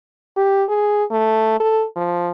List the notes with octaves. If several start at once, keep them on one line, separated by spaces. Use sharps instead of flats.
G4
G#4
A3
A4
F3